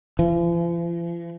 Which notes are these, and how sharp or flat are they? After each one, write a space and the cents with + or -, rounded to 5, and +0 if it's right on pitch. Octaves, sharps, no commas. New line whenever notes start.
F3 -45